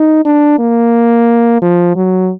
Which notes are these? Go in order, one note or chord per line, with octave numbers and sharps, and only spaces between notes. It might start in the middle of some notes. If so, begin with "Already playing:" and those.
Already playing: D#4
D4
A#3
F3
F#3